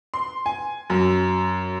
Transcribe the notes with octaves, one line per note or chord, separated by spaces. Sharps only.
C6
G#5
F#2